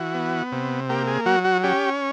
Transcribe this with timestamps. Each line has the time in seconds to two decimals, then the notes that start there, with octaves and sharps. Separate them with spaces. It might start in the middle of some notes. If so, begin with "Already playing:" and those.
Already playing: E3 F#4
0.14 B3
0.52 C3
0.89 A#3 G4
1.07 G#4
1.26 F#3 F#4
1.45 F#4
1.63 C#4 G4